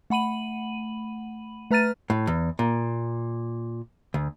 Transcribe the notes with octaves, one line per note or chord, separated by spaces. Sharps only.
A3 F#5 B5 D#7 F#7
A3 B4 A#5 F6 A6 D#7
A2
E2
A#2
D2